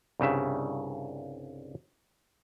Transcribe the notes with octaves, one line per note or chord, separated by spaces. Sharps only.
C2 G2 C#3 E5